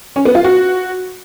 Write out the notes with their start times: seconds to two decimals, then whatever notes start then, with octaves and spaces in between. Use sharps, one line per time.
0.16 C#4
0.25 B3
0.35 F4
0.44 F#4